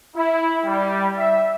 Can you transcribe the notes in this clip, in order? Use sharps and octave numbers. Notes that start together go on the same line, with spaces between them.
E4
G3
E5